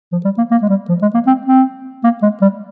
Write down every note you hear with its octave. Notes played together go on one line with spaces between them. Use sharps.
F3
G3
A#3
A#3
G#3
G3
F3
G#3
A#3
C4
C4
A#3
G#3
G3